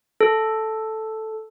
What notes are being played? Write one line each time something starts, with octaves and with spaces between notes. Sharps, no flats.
A4